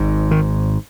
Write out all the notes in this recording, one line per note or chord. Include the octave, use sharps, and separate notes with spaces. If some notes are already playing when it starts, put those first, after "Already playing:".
Already playing: G#1 G#2
D#3